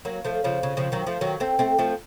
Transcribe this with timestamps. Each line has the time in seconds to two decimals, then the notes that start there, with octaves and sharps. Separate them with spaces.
0.05 F#3 A#3
0.25 F3 A3
0.44 C#3 F3
0.63 C#3
0.77 C#3 F3
0.92 D#3 F#3
1.07 F3 A3
1.21 D#3 F#3
1.40 A3 C4
1.59 A3 C4
1.79 F3 A3